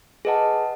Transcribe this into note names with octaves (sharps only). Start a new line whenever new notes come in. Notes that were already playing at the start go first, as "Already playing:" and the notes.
G#4 B4 D#5 F#5 A5